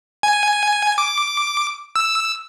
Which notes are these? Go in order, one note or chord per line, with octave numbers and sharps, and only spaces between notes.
G#5
D6
E6